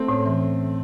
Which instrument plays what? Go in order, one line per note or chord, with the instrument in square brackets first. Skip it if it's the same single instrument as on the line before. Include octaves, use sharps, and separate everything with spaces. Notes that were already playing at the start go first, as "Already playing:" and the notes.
Already playing: [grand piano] A3 C4
[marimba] A2 [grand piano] C#4
[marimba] E3